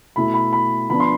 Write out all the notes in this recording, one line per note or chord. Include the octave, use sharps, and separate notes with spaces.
B2 A3 E4 B5
B5
B5
F3 B3 D4 B5
C6